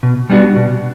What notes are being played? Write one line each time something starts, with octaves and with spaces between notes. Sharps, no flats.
B2
G3 B3 D4 F#4
B2